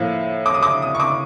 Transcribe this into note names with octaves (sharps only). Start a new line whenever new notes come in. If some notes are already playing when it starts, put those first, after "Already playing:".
Already playing: A2 F3 A#3
D6
D#6
D6
D#6
C#6
D6